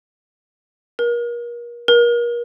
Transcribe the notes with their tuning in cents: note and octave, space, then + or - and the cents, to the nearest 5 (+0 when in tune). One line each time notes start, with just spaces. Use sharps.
A#4 +35
A#4 +35